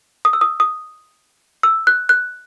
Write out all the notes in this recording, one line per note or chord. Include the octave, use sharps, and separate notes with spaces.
D#6
E6
D#6
D#6
E6
F#6
F#6